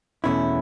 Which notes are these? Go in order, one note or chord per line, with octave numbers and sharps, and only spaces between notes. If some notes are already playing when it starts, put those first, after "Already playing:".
E2 B2 A3 C#4 E4